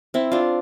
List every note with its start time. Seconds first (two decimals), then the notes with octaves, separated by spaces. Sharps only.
0.14 C4 E4
0.32 D4 F4